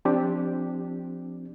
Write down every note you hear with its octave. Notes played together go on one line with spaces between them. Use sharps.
F3 C4 D4 G4